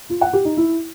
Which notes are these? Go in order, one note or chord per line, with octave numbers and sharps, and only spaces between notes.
F4
F#5
G4
D#4
E4